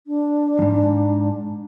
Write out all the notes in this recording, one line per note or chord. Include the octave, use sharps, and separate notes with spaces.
D4
F2 G#2